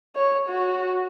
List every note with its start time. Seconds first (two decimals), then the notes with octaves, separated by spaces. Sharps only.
0.16 C#5
0.49 F#4